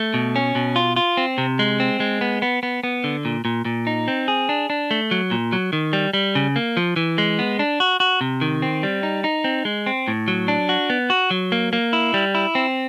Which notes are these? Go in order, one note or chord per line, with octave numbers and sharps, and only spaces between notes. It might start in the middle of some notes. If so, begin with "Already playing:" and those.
Already playing: A3
B2
C#4
B2
F4
F4
C4
C3
G#3
C4
G#3
B3
B3
B3
B3
D3
A#2
A#2
A#2
D#4
C4
G#4
D4
D4
A3
F#3
A#2
F#3
D#3
G3
G3
C#3
A#3
F3
E3
G#3
B3
D4
F#4
F#4
C3
D#3
C4
G3
D#4
D#4
C4
G#3
C4
A2
F#3
D4
F#4
B3
F#4
F#3
A#3
A#3
E4
G3
E4
C4